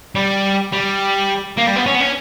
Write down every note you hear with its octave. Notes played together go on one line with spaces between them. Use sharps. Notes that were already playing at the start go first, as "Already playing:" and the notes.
G3
G3
A#3
G3
B3
C#4
B3
C#4